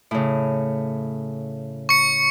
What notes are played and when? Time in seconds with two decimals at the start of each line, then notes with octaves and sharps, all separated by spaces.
0.11 A2 C#3
1.89 C#6 C#7